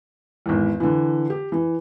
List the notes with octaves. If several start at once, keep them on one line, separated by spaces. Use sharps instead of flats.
G#1 E2
D3 E3
G4
E3